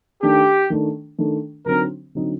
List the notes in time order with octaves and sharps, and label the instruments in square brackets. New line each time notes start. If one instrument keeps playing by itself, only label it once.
[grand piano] D#3 A3 D4 [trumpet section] G4
[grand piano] D#3 A3 D4
D#3 A3 D4
[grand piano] D3 F#3 C4 D#4 [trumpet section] A#4
[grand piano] D3 F#3 C4 D#4